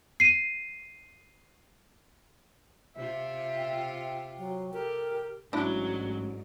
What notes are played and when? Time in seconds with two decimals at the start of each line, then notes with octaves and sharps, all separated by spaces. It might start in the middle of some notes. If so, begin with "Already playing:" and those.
0.20 C7 D#7
2.96 C3 F4 E5
3.57 G5
4.38 F#3
4.73 G4 A4 A#4
5.53 A1 G#2 F#3 D4 E4